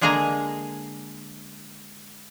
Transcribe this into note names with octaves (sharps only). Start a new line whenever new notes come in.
D3 G#3 A#3 G#4 G#5 A#5